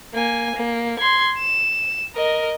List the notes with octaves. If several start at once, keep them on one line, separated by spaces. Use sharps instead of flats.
A#3 G#5
A#3
C6 G#6
E7
A#4 D#5